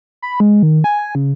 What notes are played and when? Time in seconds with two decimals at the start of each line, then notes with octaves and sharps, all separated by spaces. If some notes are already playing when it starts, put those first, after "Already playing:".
0.22 B5
0.40 G#3
0.63 D#3
0.84 G#5
0.99 G#5
1.15 C#3